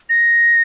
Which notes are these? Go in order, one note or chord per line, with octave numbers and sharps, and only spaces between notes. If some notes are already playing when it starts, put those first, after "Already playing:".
A#6